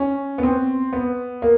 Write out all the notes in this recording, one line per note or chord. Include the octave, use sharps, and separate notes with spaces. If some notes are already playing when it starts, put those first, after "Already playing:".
Already playing: C#4
B3
C4
B3
A#3